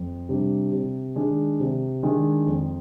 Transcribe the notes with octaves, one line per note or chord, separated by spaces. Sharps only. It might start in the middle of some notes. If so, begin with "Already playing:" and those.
Already playing: F2
C3 G3 D4
C3
D#3 G#3 D4 G#4
C3
D#3 G#3 D4 G#4
F2